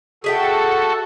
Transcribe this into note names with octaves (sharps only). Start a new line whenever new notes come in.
F#4 G#4 A4 E5 G5